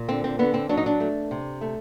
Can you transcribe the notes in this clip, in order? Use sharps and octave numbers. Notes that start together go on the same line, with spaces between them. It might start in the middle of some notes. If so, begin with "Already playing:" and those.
Already playing: A#2
D3 C4
C4
D3 B3
C4
F#3 D4
D#4
D4
A3
C3
A3